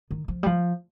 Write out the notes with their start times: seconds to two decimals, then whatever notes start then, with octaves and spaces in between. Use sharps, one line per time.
0.11 D#3
0.28 F3
0.43 G3
0.46 F3